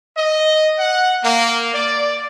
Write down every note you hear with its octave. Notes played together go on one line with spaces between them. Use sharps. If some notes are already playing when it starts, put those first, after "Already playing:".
D#5
F#5
A#3
D5